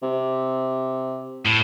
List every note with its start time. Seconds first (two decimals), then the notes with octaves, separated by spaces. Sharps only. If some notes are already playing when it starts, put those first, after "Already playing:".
0.03 C3
1.45 A2